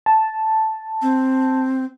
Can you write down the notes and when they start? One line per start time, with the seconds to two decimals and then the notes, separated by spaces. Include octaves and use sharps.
0.06 A5
1.02 C4